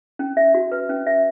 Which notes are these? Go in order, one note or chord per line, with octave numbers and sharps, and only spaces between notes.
C#4
E5
F#4
B4
C#4
E5